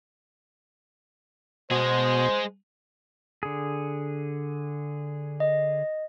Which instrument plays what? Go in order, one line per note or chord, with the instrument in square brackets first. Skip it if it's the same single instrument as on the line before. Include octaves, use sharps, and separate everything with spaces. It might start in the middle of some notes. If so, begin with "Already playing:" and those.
[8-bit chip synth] B2 [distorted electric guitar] G#3 G#4 [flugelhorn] C5
[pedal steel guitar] D3 G#4
[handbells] D#5